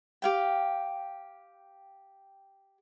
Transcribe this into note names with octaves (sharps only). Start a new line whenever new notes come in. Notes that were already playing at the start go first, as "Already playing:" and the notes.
G4 F5 G5